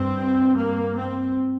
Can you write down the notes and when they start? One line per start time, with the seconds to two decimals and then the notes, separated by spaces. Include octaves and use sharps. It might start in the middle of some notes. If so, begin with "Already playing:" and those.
Already playing: G2 C4
0.56 A#3
0.97 C4